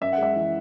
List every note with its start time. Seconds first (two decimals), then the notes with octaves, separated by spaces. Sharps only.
0.01 F#2 E5
0.12 F#5
0.18 G#3 E5
0.36 E3